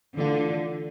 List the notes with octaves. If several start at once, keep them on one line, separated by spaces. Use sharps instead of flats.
D3 E3 A3 D4 F4